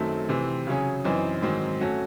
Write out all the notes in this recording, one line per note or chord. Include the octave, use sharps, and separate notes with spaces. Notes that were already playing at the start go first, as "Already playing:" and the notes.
Already playing: F#2 D#3 F#3 A3 C4
C3 E3 C4
C#3 F#3 C#4 G#4
F#2 E3 C4 D#4
G#2 D#3 F#3 C4
F#3 A3 C#4 F#4